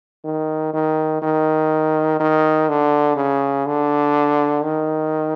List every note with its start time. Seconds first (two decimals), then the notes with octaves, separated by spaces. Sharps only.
0.25 D#3
0.74 D#3
1.22 D#3
2.20 D#3
2.69 D3
3.16 C#3
3.66 D3
4.63 D#3